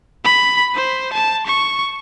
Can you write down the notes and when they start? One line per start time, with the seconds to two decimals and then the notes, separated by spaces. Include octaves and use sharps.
0.24 B5
0.75 C5
1.13 A5
1.46 C#6